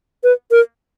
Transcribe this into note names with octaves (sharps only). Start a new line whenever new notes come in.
B4
A#4